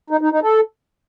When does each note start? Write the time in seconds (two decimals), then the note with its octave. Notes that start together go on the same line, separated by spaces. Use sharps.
0.10 D#4
0.21 D#4
0.32 D#4
0.42 A4